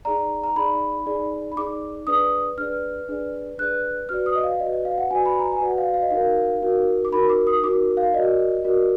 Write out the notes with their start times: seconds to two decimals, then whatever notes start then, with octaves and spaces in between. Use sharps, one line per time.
0.05 D#4 G#4 D5 A#5
0.44 A#5
0.56 D#4 G#4 D5 B5
1.06 D#4 G#4 D5
1.52 B5
1.56 D#4 G#4 D5 D6
2.07 D4 G#4 B4 D5 D#6
2.58 D4 G#4 B4 D5 F6
3.08 D4 G#4 B4 D5
3.58 D4 G#4 B4 D5 F#6
4.09 F#4 B4 D5 F6
4.26 D#6
4.35 D#5
4.44 F5
4.60 F#4 B4 D5 D#5
4.73 D#5
4.85 F5
4.98 F#5
5.11 F#4 B4 D5 G#5
5.26 B5
5.39 A#5
5.52 G#5
5.61 F#4 B4 D5 F#5
5.78 F5
5.94 F5
6.02 D#5
6.10 D#4 F#4 A#4 F5
6.62 D#4 F#4 A#4
7.05 D6
7.12 D#4 F#4 A#4 B5
7.29 D6
7.47 D#6
7.63 D#4 F#4 A#4 D6
7.97 F5
8.14 F#4 A#4 D5 D#5
8.64 F#4 A#4 D5